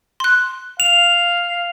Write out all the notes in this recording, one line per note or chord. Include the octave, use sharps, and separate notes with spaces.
C6 F#6
F5 F7